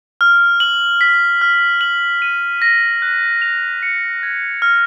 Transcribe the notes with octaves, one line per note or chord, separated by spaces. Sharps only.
F6
F#7
B6
F6
F#7
D#7
A#6
F#6
F7
C#7
G#6
F6